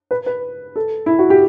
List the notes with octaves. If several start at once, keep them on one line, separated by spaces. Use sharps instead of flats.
B4
B4
A4
E4
F#4
G4